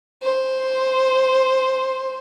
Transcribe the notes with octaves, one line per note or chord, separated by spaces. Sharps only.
C5